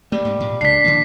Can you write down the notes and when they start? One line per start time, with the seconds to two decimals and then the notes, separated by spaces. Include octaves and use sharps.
0.12 G3 A3 A#3
0.25 G#2
0.40 A#2
0.61 C#2 C#3 D4 B6 C7
0.84 D3 E3 A#3